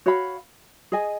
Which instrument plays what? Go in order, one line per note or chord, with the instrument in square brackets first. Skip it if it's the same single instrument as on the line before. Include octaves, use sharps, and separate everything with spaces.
[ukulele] F#4 C#5 F5 B5
G#4 D#5 G#5